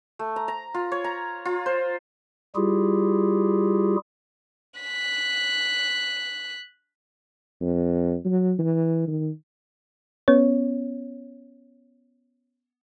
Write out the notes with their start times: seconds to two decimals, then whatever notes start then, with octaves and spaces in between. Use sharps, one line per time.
0.19 A3
0.36 A#5
0.48 A#5
0.74 F4
0.92 C#5
1.04 A#5
1.45 F4
1.66 C5
2.56 G3 E4 F4 G4 G#4
4.80 F#6 B6
7.61 F2
8.25 F#3
8.59 E3
9.08 D#3
10.28 B3 C#4 C#5